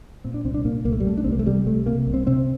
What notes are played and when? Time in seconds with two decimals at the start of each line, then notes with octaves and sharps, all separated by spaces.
0.24 A#2 C4
0.34 D4
0.45 C2 C4
0.54 D4
0.65 A#2 A#3
0.85 C2 A#3
0.92 A3
1.00 G3
1.06 C3 A3
1.17 D4
1.24 C2 C4
1.32 A#3
1.39 A3
1.46 C3 G3
1.66 C2 A3
1.86 C3 A#3
2.07 C2
2.14 C4
2.27 C3 C4